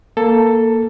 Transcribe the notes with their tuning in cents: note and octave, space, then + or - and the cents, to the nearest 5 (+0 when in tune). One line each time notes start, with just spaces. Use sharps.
A#3 +0 A4 +10